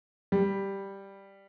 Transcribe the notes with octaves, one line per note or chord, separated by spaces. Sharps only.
G3